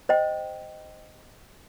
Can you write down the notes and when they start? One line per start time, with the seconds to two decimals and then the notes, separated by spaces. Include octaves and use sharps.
0.09 C5 D#5 G5